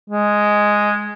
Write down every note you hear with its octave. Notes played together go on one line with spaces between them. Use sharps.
G#3